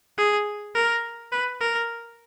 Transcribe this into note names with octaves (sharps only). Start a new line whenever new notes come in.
G#4
A#4
B4
A#4